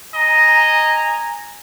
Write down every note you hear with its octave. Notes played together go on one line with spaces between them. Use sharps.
D#5 G#5 A#5